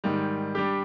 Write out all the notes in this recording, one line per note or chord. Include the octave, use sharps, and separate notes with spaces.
G#2 D#3 G3
G3 D4 G4